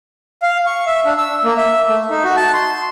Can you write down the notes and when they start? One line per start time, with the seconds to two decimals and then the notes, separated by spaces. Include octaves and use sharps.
0.42 F5
0.67 C#6
0.87 E5
1.05 D4
1.18 E6
1.44 A#3
1.57 E5
1.88 A3
2.10 D#4
2.24 F#4
2.37 A5
2.54 C6